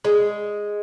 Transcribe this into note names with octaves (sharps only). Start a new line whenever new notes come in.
G#3